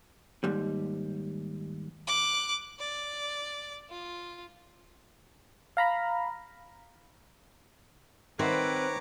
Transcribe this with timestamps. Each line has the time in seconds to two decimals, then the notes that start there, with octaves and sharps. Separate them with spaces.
0.44 D#2 G#2 G3
2.07 D6 F#6
2.79 D5
3.90 F4
5.77 F5 A#5 B5
8.39 D#3 C4 B4 C#5 E5 F#5 A#5 D6